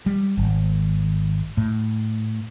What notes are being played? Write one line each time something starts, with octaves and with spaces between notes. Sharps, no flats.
G3
G#1
A2